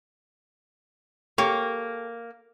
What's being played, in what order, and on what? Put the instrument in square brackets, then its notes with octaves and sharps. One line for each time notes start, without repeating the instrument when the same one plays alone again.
[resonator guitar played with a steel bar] A#3 [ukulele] G4 A4 A#4 [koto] C#5